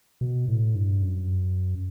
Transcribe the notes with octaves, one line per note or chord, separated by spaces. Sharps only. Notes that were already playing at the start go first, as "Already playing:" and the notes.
B2
A2
G2
F#2